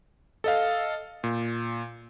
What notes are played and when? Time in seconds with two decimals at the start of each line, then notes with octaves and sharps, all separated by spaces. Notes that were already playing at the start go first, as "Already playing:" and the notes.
0.44 A4 D#5 F5
1.24 A#2